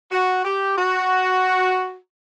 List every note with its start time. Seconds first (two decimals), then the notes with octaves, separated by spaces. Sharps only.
0.12 F#4
0.45 G4
0.78 F#4